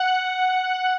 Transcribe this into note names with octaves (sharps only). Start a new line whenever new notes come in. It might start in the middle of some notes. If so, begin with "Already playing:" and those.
Already playing: F#5